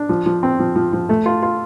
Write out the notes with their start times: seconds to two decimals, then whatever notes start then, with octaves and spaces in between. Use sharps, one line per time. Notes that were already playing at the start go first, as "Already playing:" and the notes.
Already playing: D4
0.09 F3
0.26 F3
0.43 C4
0.59 F3
0.76 F3
0.93 F3
1.09 A3
1.26 F4
1.42 F4